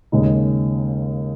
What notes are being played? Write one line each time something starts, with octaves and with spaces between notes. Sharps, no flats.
D#2 C#3 G#3 D#4